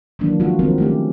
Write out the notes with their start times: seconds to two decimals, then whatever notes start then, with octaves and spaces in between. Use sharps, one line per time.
0.19 D#3 E3 F#3 G#3 A#3 D4
0.40 F3 G#3 A#3 F4 F#4
0.59 D#3 G3 G#3 C4 A#4
0.78 A3 C#4 G4